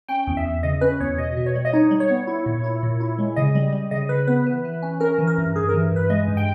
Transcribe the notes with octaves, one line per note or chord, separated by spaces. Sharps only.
C#4 G5
E2
E5
E2
C#3 D#5
C#4 B4
E2 C#5
B2 D#5
B2
C#5
G3
D#5
D#4 C#5
G3
C#5
B3
E4
A#2
E4
A#2
E4
G#3
C#3 D#5
G3
G3
C#3 D#5
C#3 B4
B3 B4
E3
E3
C#4
C#4 A#4
E3
A#4
G2
G2 G#4
E3 A#4
G2 B4
G#3 D#5
G2
G5